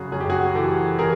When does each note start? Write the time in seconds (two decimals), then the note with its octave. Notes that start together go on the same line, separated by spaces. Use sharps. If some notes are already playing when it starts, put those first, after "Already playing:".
Already playing: F#2 C#3 F#4 G#4
0.12 F#2 G#4
0.20 G4
0.30 F#4 G#4
0.55 E3 G4 A4
0.99 E3 G#4 A#4